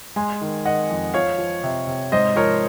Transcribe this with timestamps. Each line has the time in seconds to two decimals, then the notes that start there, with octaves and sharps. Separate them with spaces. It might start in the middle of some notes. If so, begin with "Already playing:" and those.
0.16 G#3 G#5 C6
0.41 D#3
0.66 D#3 D#5 F#5
0.90 F2
1.14 F3 C#5 F5
1.38 F3
1.63 C3
1.87 C3
2.12 G#2 C5 D#5
2.36 F3 A#4 C#5